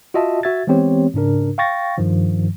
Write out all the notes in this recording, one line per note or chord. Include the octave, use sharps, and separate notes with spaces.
F4 F#4 D#5 E5 A5
F#4 E5 G#6 A6
E3 G#3 B3 C4 G4 C#5
G#2 C#3 D4 A#4
F5 G5 C#6 A6 A#6
G2 D#3 F3